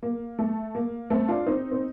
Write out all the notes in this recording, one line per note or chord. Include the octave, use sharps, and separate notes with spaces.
A#3
A3
A#3
A3 C4
D4 F4
C4 D#4
C4